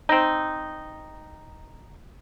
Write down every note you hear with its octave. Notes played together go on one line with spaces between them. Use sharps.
C4 D#4